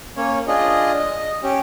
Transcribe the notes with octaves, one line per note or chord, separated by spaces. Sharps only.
A#3 C#4 C#5
D4 F4 G#4 D#5
D#5
C#4 G4